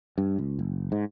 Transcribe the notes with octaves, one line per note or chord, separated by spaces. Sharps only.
G2
C#2
F#1
G#2